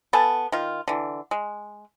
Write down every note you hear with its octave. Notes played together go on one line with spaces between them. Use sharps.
B3 A4 G#5 A5
D#3 F4
D3 E3
G#3